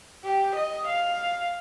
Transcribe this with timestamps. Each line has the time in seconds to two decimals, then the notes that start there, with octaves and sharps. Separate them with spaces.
0.24 G4
0.56 D#5
0.88 F5